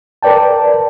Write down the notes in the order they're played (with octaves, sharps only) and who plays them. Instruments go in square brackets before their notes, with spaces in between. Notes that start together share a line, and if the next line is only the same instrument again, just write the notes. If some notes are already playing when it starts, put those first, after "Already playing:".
[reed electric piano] A#4 B4 D5 G5 A5